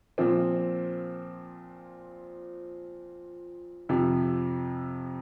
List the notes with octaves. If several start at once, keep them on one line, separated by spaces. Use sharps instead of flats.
A#2 F3 C4
F2 C3 F3